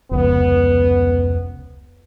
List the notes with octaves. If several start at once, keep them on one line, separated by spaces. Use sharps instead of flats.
F1 C#2 B3